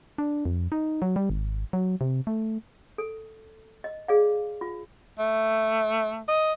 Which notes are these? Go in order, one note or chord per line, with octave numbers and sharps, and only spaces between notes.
D4
F2
D#4
F#3
G3
G#1
F#3
C3
A3
A4
D#5
G#4 D5 F5
F4
A3
D#5